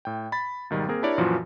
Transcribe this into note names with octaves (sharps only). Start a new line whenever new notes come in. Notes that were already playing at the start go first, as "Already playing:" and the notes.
A2 G5
B5 A6
B1 G#2 D#3 G3
A#3 C4 G#4 A#4
D4 E4 G4 A#4 C#5 D5
F#2 A#2 E3 F3 F4 F#4